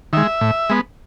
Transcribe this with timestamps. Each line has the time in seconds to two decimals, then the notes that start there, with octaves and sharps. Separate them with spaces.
0.13 D#3 G#3 E5
0.41 A2
0.70 G#3 B3